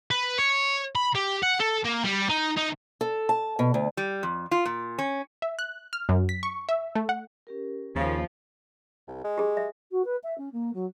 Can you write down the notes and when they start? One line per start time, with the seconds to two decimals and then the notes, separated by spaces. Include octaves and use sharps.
0.11 B4
0.38 C#5
0.95 B5
1.15 G4
1.42 F#5
1.60 A4
1.85 A#3
2.04 G3
2.29 D#4
2.57 D#4
3.01 A4
3.29 A5
3.59 B2
3.74 D2
3.97 G3
4.23 F2
4.51 F4
4.66 A#2
4.98 C#4
5.42 E5
5.59 F#6
5.93 F6
6.09 F#2
6.29 B6
6.43 C#6
6.69 E5
6.96 A3
7.09 F#5
7.47 C#4 G4 A#4
7.96 D#2 C#3 F3
9.08 C2
9.24 G#3
9.38 G4 G#4
9.57 E5
9.91 F#4
10.04 B4
10.23 E5
10.38 C#4
10.52 A#3
10.73 F#3